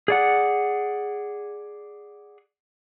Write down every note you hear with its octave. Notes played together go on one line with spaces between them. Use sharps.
G#4 D5 F#5